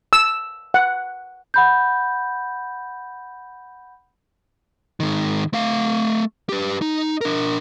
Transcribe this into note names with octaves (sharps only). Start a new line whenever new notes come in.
E6
F#5
F#5 B5 G6
G#2 D#3
A3 F5
G4 B4
D#4
D4 A#4